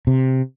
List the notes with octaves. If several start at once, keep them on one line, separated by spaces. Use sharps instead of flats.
C3